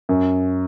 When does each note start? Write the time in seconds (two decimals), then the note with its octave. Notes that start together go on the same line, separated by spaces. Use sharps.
0.09 F#2